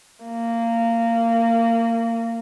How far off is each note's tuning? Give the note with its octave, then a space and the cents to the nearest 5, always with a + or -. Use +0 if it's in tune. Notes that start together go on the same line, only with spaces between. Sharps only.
A#3 -20